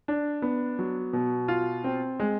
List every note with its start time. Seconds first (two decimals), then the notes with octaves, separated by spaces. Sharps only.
0.08 D4
0.42 B3
0.79 F#3
1.13 B2
1.48 F4
1.84 C4
2.20 G#3